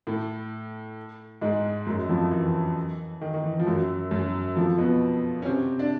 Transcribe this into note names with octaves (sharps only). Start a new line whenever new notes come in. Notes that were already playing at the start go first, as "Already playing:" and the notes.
A2 A3
G#2 G#3
F#2 F#3
F2 F3
E3
D#3
D#3
E3
F3
F#2 F#3
F#2 F#3
F2 F3
B2 B3
C#4
C3 C4
D4